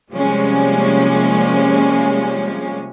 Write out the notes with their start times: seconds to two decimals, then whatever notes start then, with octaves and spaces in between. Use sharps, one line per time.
0.13 C3 F3 G3 G#3 A#3 C#4